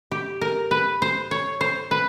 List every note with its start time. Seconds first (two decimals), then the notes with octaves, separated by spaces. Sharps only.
0.11 G4
0.41 A#4
0.71 B4
1.02 C5
1.31 C#5
1.61 C5
1.91 B4